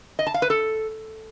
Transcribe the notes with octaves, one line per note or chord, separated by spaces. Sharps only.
D#5
A5
F5
B4
A4